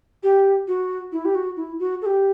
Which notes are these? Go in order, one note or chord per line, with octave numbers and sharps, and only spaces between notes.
G4
F#4
E4
G4
F#4
E4
F#4
A4
G4